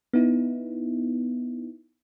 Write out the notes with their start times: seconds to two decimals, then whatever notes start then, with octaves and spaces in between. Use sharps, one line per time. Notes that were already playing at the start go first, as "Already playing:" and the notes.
0.13 B3 D#4 E4